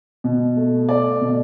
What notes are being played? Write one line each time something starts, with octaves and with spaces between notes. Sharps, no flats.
B2
A3
A3 D5
B2